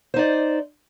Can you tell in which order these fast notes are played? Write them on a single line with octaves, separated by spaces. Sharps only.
C5 D#4 D5